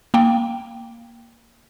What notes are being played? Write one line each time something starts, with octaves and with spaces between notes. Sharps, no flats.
A#3 G5